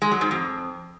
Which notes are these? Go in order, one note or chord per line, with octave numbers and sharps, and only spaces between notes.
G#3
F#3
G#2
F2